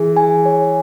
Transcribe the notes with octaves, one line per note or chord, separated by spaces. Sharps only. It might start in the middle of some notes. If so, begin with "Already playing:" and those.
Already playing: E3 G#4
G#5
C#5